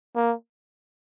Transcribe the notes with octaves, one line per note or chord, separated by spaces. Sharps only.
A#3